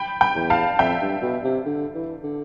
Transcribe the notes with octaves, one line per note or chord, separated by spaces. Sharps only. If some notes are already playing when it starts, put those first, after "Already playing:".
Already playing: G5 B5
G5 B5
E2
F5 A5
F2 E5 G5
G2
B2
C3
D3
E3
D3